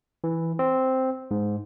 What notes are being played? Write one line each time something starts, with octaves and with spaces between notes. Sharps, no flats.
E3
C4
G#2